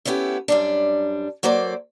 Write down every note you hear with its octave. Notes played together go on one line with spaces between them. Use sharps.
A3 B3 C#4 E4 G4
F#2 G3 D4
F#3 A#3 A4 C5 D5